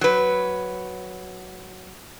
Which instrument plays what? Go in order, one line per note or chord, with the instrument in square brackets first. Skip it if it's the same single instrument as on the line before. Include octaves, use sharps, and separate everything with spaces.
[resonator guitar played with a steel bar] F#3 B4